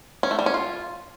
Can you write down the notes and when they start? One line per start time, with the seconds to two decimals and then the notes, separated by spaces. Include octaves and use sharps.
0.23 C#4
0.31 A3
0.39 G3
0.46 C#4
0.54 F4